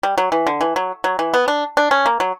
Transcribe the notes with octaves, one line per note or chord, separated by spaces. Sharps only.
G3
F#3
E3
D3
E3
F#3
F#3
E3
B3
D4
D4
C#4
A#3
F#3